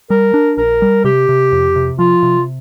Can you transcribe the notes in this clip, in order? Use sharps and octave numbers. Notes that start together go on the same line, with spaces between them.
G3 A#4
D4
A#1 A#4
G3
C3 G4
C3
F2
C3
F3 F4
C3